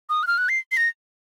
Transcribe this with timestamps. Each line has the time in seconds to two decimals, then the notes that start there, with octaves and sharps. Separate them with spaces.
0.09 D#6
0.23 F#6
0.27 F6
0.38 F#6
0.49 C7
0.72 C7
0.77 A#6